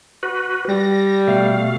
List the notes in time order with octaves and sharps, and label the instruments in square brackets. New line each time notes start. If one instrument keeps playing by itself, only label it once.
[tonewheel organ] F#4 B4
[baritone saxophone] G3 [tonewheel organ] A#6
[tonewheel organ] B2 A3 F5